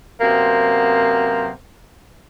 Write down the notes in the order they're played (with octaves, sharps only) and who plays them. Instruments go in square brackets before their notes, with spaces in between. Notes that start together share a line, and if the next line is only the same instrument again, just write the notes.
[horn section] F#2 C3 A#3 B3 C5